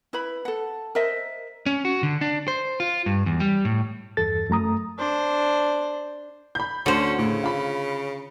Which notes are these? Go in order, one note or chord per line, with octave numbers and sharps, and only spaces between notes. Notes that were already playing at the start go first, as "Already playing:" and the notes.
E4 B4 B5
A4 F#5
A#4 C5 D#5 E5
C#4
F#4
D3
D4
C5
F4
G2
E2
G3
A2
E2 G2 A4 A6
F#2 A3 A#5 D#6
D4 C5
B5 G6
D2 D3 C#4 C5
A2 C#3
F4 B5